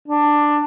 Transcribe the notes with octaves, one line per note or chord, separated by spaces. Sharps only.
D4